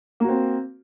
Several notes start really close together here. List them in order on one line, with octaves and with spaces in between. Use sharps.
A#3 F#4 C4